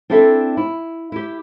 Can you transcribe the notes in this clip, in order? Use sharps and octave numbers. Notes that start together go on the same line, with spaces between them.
C4 D4 E4 G4 A4 E5
E4
E4 G4